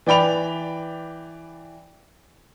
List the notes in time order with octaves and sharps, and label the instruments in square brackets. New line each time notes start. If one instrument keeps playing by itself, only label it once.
[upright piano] E3 D5 G5 B5 F7